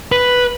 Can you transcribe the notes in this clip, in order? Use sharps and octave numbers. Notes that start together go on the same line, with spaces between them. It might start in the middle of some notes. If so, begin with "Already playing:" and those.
B4